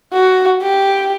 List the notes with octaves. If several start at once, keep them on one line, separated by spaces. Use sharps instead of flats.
F#4
G4